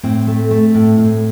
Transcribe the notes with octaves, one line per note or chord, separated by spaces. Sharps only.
A2 C4
A3
A3
A2
A2